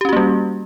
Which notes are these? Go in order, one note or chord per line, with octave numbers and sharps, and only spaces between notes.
G3 A#3 C#4 F#4 G4